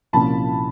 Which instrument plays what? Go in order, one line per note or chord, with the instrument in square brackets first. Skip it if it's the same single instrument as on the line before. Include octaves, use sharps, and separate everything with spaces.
[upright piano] C2 A#2 F3 A#3 C#4 A5 B5